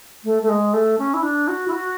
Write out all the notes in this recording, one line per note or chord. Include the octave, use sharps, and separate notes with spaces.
A3
A3
G#3
A3
C#4
E4
D4
F#4
E4
F#4